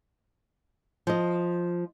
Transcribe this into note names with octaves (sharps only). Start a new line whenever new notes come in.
F3 D#5